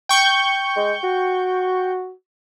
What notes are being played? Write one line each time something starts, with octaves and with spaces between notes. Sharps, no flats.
G5 C#6 G6
G#3
F#4